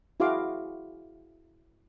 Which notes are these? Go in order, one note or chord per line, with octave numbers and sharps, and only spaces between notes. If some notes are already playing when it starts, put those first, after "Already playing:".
E4 F#4 G#4 F5 C6 D6